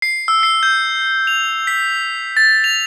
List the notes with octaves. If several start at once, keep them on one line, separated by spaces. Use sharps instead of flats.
C7
E6
C7
G6
F7
B6
A6
F7